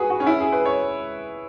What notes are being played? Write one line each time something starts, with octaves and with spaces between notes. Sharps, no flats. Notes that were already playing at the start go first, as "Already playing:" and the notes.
Already playing: F#4 G#4 B4
F#4
C#4
E4
G#4
B4
C#5